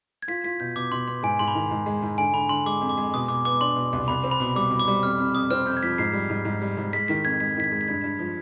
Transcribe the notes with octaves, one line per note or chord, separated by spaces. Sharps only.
G#6
F4 B6
F4 B6
B2 G6
B2 D6
B2 C6
B3 C6
G#2 G#5
G#2 C6
B5
D#3
G#2
G#3
G#2
D3 G#5
D3 B5
D3 C6
G#3 D6
F2
D6
G#3
B2 D#6
B2 D6
B3 D6
D4 C6
B2
C2
C2 B5
C4
B5
B2
G3 D6
B2
D6
G3
F2 F6
C3 F6
F2 D#6
C4 F6
F2 G6
G#6
F3 B6
G#2 C7
G3
G#2
G#2
G3
G#2
G#3 B6
D#3 B6
F2 G#6
G#3 B6
D#3 B6
G#6
G#3
B6
G2 G#6
G2
F3